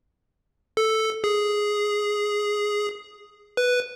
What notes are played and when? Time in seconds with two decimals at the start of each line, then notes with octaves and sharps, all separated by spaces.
0.77 A4
1.24 G#4
3.57 B4